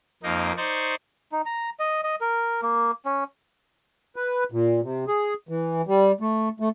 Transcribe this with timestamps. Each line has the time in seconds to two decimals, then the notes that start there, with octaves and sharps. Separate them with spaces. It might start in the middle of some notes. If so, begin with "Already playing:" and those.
0.23 F2 A#3 D#4
0.57 D#4 C5 D5 C#6
1.32 D#4
1.46 A#5
1.80 D#5
2.04 D#5
2.21 A#4
2.62 A#3
3.06 C#4
4.16 B4
4.52 A#2
4.82 C3
5.08 G#4
5.49 E3
5.87 G3
6.21 A3
6.60 A3